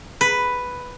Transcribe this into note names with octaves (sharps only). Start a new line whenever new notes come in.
B4